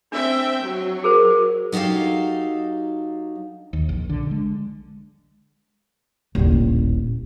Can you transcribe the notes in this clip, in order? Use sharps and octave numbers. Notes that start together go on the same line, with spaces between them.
C4 D4 E5 G5
F#3
G#4 A#4 C5
F#3 D#4 G4 A4 F5
D#2
A#1
D3
G#3
D#1 A1